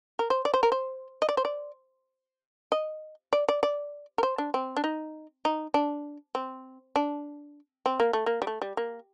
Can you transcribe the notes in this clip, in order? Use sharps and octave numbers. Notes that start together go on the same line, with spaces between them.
A#4
C5
D5
C5
A#4
C5
D#5
D5
C5
D5
D#5
D5
D5
D5
A#4
C5
D4
C4
D4
D#4
D#4
D4
C4
D4
C4
A#3
A3
A#3
G3
A3
G3
A#3